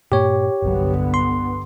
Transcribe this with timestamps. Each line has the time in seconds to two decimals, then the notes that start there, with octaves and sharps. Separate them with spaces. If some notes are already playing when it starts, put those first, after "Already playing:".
0.12 G2 A#2 A#3 G4 C#5
0.62 G1 C2 G2 D3 F#3 B3
1.14 C6